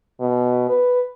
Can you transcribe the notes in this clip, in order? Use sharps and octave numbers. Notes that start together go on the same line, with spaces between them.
B2
B4